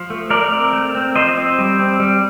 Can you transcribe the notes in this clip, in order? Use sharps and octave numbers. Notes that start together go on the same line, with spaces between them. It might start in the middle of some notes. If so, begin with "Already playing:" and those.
Already playing: F3
A3
A3 A#4 D5
C4
A3
C4
F3 C5 D#5
C4
G3
C4
G3